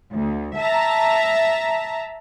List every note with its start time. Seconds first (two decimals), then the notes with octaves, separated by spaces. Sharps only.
0.12 D2
0.58 E5 A5 A#5